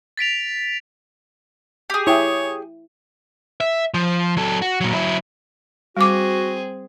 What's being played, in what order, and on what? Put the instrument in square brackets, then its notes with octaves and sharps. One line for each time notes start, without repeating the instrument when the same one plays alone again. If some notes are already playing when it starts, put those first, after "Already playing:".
[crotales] A6 B6 D7 F7
[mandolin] G4 G#4
[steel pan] E4 G5 [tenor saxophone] C#5
[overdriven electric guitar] E5
F3
F#3 A4
F#4
A#2 F#3
F#3 E4
[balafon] G3 D6 [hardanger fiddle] C4 G#4 [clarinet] F#4